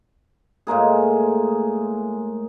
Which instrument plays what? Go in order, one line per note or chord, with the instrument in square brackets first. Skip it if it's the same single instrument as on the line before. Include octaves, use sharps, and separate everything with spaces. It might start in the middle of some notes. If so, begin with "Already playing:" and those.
[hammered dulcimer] A2 G#3 A#3 G#4